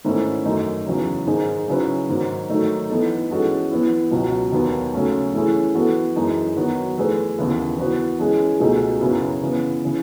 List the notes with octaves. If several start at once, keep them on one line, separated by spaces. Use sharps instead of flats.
G#2 D#3 A3 C#4 E4
F#2 D#3 A3 D#4
E2 C#3 F#3
G#2 D#3 G#3 D#4 G#4
C#3 F#3 C#4 E4 B4
G#2 D#3 F#3
D#3 F#3 A3 D#4
E3 B3 D#4 A4
E3 G#3 C#4 F#4 A4
E3 B3 E4
C#2 B2 F#3
D#2 D#3 F#3 B3
C#3 F#3 A3 C#4
E3 A3 C#4 E4 G#4
E3 B3 F#4 A4
F#2 E3 G#3 D#4
D#3 F#3 B3 F#4
E3 A3 E4 G#4 B4
D#2 C#3 E3 B3 E4
E3 B3 F#4 B4
E3 G#3 C#4 G#4
C#2 B2 A3 D#4 G#4
F#2 C#3 F#3 B3 E4
C#3 E3 B3
C#3 E3